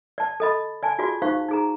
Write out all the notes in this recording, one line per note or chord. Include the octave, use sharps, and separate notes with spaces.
D5 A5
A4 D#5 B5
D5 G#5 A5
F4 F#4 G#4 D5
D#4 C5 F5 C#6
D#4 G#4 A#5